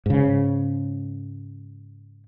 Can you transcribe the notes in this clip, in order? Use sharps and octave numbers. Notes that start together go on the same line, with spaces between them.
G#2 C#3